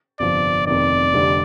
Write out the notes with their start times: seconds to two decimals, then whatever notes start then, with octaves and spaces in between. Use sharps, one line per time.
0.20 G1 F2 C3 F3 D5
0.67 F1 F2 D#3 D5
1.14 F1 F2 D3 G3